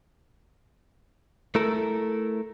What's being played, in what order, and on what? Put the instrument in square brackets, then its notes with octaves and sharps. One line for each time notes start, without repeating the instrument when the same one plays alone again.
[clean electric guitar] A3 E4 A4 A#4